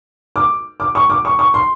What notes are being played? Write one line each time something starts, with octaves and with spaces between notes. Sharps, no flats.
D6
D6
C#6
D6
C#6
C#6
C6